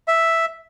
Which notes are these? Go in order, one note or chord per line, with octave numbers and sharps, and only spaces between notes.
E5